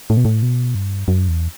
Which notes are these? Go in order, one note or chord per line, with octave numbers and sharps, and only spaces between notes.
A2
B2
A2
B2
G2
F#2
E2